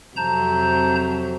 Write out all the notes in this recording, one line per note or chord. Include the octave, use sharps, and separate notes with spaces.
F2 C3 F#3 A5 A#5 G6